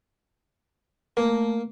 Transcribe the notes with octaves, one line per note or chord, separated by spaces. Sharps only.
A3 A#3